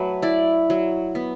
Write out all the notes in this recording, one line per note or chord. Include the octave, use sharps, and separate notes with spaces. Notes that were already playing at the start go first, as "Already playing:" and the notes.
Already playing: F#3 A3 B4
E4 D5
F#3
B3